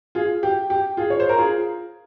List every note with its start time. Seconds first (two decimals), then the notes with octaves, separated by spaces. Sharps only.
0.15 F4 G#4
0.43 G4
0.70 G4
0.97 F4 G#4
1.10 C#5
1.20 C5
1.29 A#4
1.38 F4 G#4